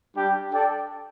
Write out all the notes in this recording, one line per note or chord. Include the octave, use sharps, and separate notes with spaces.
G3 D4 G4
D4 A4 D5 G5